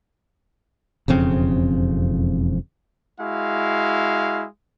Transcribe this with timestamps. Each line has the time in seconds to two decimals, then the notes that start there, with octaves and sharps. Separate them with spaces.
1.08 E1 F2 C#3 C4
3.21 G#3 E4 F#4 F5